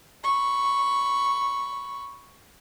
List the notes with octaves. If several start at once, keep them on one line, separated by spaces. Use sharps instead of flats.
B5 C#6